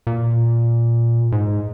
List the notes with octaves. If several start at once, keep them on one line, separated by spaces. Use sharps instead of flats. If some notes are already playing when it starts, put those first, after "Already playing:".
A#2
G#2